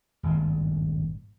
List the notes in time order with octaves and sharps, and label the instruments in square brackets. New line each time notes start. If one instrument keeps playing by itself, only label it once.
[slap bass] D#1 G#1 G2 A#2